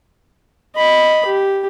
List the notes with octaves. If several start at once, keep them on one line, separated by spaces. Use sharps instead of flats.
D#5 B5
G4